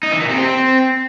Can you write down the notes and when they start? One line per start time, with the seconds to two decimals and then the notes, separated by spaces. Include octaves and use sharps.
0.03 D#4
0.12 E3
0.21 A#2
0.29 C3
0.38 C4